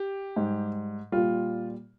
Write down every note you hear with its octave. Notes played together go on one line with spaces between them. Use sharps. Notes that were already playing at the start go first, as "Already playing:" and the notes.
Already playing: G4
G#2 G3
A#2 G3 F4